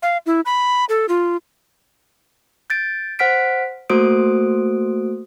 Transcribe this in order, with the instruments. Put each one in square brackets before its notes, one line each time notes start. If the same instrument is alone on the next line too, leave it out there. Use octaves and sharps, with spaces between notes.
[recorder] F5
E4
B5
A4
F4
[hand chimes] G6 A6 D7
C5 F#5 F6 B6 D7
A3 A#3 F#4 C5 D#6 D7